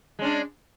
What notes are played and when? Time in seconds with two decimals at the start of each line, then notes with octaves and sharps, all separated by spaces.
0.19 G#3
0.21 C#4
0.24 D4